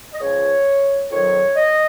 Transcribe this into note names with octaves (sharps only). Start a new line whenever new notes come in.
D#5
C#2 C#3 F3 C#5
F2 D#3 F#3 C#5
D#5